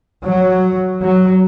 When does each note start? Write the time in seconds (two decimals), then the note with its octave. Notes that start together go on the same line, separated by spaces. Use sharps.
0.23 F#3
1.02 F#3